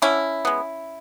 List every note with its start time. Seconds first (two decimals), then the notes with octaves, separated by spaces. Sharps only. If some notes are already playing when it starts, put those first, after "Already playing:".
0.02 D3 C#4 E4
0.45 G#3 B3